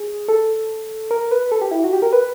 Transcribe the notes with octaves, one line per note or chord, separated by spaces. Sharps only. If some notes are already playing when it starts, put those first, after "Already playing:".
Already playing: G#4
A4
A#4
B4
A4
G4
E4
F#4
G4
A#4
B4